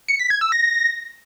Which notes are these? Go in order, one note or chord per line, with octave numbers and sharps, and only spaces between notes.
C#7
B6
G#6
E6
A#6